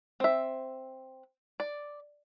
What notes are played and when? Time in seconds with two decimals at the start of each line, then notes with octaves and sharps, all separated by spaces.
0.20 C4 E5
1.60 D5